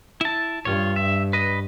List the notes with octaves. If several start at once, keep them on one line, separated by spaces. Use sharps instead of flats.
E4 A5
G2 F4 C#5
E5
B4 D#5